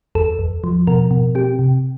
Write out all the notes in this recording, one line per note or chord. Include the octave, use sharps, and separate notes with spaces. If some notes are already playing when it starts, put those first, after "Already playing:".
E2 A4
E2
F3
B2 A#4
B2
C4 G4
C3